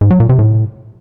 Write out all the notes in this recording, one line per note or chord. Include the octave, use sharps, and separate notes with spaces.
G#2
F#3
A#2
C3
A2